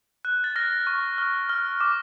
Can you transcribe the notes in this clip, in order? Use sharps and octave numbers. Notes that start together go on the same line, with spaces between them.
F#6
A6
F6 A#6
C#6
F6
F6
D6